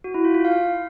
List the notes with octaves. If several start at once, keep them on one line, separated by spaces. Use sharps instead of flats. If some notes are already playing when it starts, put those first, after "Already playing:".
F#4
E4
F4
F4
F5